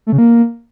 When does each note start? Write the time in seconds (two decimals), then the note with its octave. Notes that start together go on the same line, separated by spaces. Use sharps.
0.07 A3
0.12 C#3
0.18 A#3